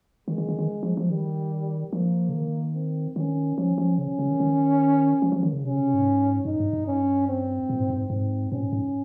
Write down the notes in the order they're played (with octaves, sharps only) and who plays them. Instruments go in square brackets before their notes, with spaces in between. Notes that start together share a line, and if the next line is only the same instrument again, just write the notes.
[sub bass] D#3 [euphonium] G#3
[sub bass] D#3
D#3
D#3
F3
F3
[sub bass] D#3 [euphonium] G3
[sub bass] F3 [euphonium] A#3
[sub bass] C#3
D#3
[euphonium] C4
[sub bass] D#3 [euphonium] C#4
[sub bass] F3 [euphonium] C#4
[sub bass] F3
[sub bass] C#3 [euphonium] C#4
[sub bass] C#3
D#3
D#3
F3
F3
D#3
C#3
[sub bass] C3 [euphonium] C#4
[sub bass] C#3
C3
G#2
[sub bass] G2 [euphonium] D#4
[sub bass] G2
G2
[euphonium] C#4
C4
[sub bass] A#2
G#2
G2
G#2
[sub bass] G#2 [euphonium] C4
[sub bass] A#2 [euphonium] C#4
[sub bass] G#2
G#2